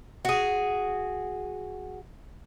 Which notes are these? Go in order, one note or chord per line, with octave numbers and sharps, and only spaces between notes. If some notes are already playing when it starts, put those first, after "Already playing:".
F#4 G#4